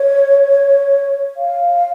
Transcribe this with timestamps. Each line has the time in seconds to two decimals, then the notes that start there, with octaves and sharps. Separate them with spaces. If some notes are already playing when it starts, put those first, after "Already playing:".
Already playing: C#5
1.37 F5